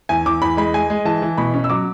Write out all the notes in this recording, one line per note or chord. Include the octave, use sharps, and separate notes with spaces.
E2 G#5
E2 D6
E2 B5
G#3 B5
G#3 G#5
G#3
E3 A5
E3
B2 B5
C#4
E6
F#3 D6